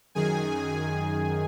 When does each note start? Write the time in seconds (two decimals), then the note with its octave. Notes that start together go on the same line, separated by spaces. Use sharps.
0.15 F#2 D#3 G#4 G#5
0.68 G#4 G#5